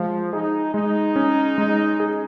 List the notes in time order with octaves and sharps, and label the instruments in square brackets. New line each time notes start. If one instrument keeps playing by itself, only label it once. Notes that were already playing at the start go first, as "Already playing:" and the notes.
Already playing: [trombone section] F3 [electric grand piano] G#3
[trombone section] D#4 [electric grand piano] G#4
[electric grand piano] G#3 [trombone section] D#4
[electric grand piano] C#4
G#3
G#4